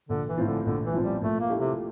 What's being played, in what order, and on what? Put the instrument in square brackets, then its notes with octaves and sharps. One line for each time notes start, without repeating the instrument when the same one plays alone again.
[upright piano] A#1 [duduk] D3
[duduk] E3
[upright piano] A2 F3 C4 F4
[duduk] D3
[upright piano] A#1 [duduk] D3
[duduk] E3
[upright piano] A2 F3 C4 F4
[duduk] G3
[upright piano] A#2 [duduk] A3
[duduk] A#3
[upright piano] A3 E4 G4
[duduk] C3